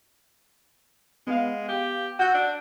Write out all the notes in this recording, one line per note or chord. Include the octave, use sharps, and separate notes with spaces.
G#3 B3 F5
G4
F#4 F#5 E6 G6
D4